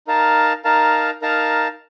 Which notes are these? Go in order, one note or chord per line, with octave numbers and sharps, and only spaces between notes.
D#4 A#4 F5 A5
D#4 A#4 F5 A5
D#4 A#4 F5 A5